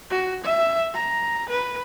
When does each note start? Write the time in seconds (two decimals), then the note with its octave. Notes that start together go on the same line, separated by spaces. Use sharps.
0.11 F#4
0.44 E5
0.94 A#5
1.49 B4